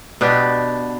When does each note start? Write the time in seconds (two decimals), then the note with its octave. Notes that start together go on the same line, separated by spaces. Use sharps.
0.21 B2 B3 D4 G4